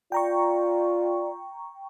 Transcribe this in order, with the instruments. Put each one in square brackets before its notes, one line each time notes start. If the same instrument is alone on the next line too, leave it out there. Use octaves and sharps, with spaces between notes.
[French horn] F4 [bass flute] D5 [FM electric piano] G5 A#5 C#6